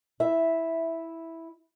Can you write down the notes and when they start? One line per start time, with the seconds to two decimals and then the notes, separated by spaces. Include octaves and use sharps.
0.20 E4 E5